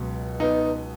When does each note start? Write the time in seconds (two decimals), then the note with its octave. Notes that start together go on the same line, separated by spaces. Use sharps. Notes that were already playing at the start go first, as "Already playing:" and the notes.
Already playing: C#2 B2 F#3
0.40 B3 D#4